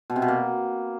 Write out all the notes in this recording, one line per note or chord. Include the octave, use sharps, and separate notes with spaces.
B2
C3
B2
A#3